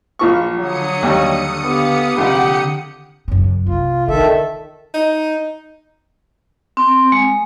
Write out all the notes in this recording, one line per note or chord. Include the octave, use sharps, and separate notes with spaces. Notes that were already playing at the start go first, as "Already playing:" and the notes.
A#1 F3 C#6
D3 F#3 D#6 C#7
D#2 G3
B3 G4 F5
A#1 C3 G4 F#5
F#2 C#3
C2 F4
D3 D#3 A4 E5
D#4
C4
G#3